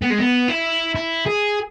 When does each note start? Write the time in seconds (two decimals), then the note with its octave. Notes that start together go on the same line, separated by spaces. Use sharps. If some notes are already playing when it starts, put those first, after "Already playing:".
0.02 B3
0.10 G#3
0.18 B3
0.48 E4
0.95 E4
1.26 G#4